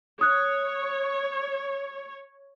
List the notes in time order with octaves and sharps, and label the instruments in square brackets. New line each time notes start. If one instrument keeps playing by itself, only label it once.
[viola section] C#5 [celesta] D#6 F#6